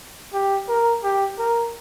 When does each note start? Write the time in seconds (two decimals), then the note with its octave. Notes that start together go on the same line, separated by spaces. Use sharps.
0.33 G4
0.68 A#4
1.03 G4
1.38 A#4